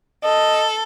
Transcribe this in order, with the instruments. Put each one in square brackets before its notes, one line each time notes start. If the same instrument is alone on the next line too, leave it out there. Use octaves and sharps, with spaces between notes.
[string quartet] A4 [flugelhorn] D#5